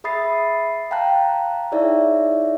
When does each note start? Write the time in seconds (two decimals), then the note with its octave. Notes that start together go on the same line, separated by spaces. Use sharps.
0.04 G#4 E5 B5 D#6 A6 C7
0.91 F5 G5 A5 A#5 F#6
1.72 D#4 E4 G#4 C#5 D5 E5